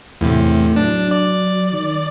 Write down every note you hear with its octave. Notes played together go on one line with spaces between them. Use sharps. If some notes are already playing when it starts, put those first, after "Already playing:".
E2 A2 C3
F#3 D4
D5
D#3